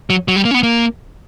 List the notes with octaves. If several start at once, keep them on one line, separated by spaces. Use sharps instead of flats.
F#3
F#3
G3
A#3
C#4
B3
A#3